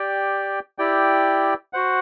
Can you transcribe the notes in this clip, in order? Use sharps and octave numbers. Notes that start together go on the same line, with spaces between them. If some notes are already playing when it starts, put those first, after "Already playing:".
Already playing: G4 D5 G5
E4 G4 D5 G5
F#4 C5 F#5